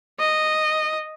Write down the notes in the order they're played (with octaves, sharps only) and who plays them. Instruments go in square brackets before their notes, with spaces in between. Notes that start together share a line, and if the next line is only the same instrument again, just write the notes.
[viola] D#5